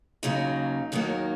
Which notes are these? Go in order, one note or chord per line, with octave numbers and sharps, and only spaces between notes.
D#2 C#3 F#3 A#3 D#4
D#2 D#3 F#3 A#3